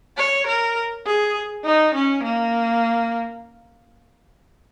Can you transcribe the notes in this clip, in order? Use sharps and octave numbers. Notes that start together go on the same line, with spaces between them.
C#5
A#4
G#4
D#4
C#4
A#3